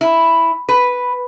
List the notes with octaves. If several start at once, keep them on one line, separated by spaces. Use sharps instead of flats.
E4
B4